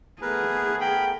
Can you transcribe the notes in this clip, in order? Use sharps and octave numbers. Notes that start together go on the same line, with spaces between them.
A3 B3 G#4 A#4 B4
A#4 G5 B5